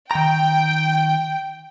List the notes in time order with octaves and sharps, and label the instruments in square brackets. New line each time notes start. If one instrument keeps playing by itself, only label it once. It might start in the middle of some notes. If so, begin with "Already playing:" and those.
[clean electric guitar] D#3 A#5 [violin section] G5